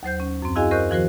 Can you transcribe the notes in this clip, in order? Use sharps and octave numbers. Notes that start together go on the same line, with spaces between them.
D#2 F#3 C5 G6
C#4
F#2 C4
E4 F#4 G#4 D#5 F5 G#5
A#4 C5 D#5 C#6 F#6 G6
D#3 F3 F#4 A#4 C5